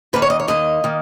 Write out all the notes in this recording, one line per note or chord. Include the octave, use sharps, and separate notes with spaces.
D#2 D#3 A#3 B4
C#5
D#5
C#5
D#2 D#3 A#3 D#5
D#3 A#3